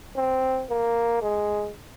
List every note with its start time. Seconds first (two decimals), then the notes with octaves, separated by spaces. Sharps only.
0.16 C4
0.69 A#3
1.22 G#3